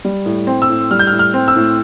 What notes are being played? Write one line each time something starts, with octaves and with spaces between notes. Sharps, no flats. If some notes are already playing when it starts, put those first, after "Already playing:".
G3
A2
C4
E6
A2
G3 F6
G6
F6
A2
F6
C4
E6
A2